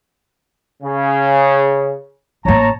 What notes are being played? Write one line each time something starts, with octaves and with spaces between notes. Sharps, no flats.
C#3
A1 A#3 C#5 A5 A#5